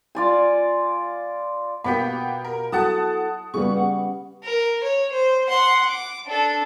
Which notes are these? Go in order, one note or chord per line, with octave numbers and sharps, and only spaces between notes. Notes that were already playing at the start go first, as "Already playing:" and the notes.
F4 D5 G#5
B2 A#3 B3 F4 G4 B5 B6
A#4
F#3 E4 F#4 A4 F#5 A5 D#6
C#3 G3 B3 F#4 G#4 C#6
F#5
A#4
C#5
C5
F#5 C6
D6
D4 A4